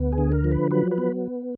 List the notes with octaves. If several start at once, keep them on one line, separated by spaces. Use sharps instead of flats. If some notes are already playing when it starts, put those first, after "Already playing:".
Already playing: D2 B3
G#4
D3
A#4
F3
B4
F#3 B4
B4
B3